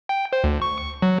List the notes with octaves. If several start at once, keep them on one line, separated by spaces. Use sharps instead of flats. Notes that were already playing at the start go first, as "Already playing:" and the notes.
G5
C5
D2
C#6
F#3